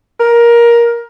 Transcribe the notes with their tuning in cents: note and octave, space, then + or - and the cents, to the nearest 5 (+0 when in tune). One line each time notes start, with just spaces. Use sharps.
A#4 +15